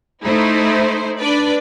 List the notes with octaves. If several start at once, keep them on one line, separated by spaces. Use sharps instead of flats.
A3 D#4 E4 C5
D4 B4 D5